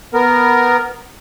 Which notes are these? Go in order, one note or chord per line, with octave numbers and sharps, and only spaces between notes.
B3 A#4